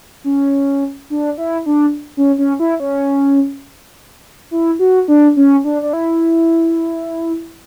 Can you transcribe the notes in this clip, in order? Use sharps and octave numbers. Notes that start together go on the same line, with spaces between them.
C#4
D4
E4
D4
C#4
C#4
E4
C#4
E4
F#4
D4
C#4
D4
D4
E4